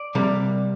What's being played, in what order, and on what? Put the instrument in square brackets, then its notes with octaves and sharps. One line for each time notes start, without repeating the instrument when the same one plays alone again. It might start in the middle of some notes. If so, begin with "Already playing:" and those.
Already playing: [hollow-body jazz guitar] D5
C3 G3 A#3